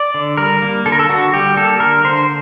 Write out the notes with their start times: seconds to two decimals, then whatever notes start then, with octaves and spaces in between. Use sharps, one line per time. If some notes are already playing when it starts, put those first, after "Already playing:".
Already playing: D5
0.14 D3
0.37 G3 A#4
0.62 A#3
0.86 D3 A4
0.92 A#4
0.99 A4
1.09 D3 F#4
1.33 G3 G4
1.56 A#3 A4
1.80 D3 A#4
2.04 D3 C5